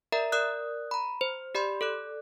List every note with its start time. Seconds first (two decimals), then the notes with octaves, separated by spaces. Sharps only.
0.12 A#4 D5 E5 A#5
0.32 A#4 D5 D#6 F#6
0.91 A#5 B5
1.21 C5
1.55 G4 D5 B5 C6
1.81 A4 D5 F#6